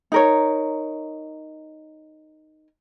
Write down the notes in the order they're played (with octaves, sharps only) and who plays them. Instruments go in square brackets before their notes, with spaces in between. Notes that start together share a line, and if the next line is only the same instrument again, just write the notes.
[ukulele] D#4 A#4 C#5